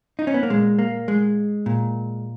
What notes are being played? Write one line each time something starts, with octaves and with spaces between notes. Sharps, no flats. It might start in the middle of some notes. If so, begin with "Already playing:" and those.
D#4
C#4
B3
A#3
A#2 G#3
A#3
G#3
A#2